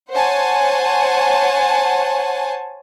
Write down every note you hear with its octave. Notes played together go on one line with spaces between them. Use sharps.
C5 C#5 F#5 G#5 A5